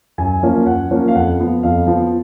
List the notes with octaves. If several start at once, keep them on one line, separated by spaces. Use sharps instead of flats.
F#2 G#5
F3 A#3 C#4
F#2 F#5
F3 A#3 C#4
F5
F2 F#5
F3 B3
F2 F5
F3 B3